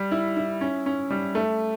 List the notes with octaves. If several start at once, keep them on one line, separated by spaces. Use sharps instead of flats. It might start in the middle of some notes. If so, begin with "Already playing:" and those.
Already playing: G3
E4
E4
C#4
C#4
G3
A3